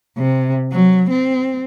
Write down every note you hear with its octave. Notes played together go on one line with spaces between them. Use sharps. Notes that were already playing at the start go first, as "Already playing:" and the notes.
C3
F#3
C4